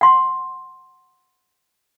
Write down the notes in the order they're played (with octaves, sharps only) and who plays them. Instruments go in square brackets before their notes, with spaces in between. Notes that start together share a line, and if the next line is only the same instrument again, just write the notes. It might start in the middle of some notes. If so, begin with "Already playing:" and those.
[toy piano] F#5 C6